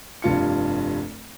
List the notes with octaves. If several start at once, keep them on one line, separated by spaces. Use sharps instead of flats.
F1 G2 F4 C#7